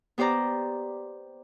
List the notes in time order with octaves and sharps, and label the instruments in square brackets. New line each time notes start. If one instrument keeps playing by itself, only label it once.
[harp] B3 G4 C5 D5 A#5